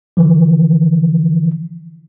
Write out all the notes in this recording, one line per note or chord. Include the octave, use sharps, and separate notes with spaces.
D3 E3 F3